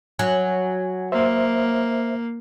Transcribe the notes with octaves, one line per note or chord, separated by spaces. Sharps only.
F#3 G#5
A#3 C5 E5